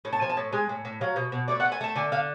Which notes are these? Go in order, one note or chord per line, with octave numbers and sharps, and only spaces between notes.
A2
A5
F3 G#5
A5
A2
G#3 G#5
A2
A2
F#3 F5
B2
B2
A3 D5
F#5
A3
G#5
A3 A5
D3 G#5
D3 F5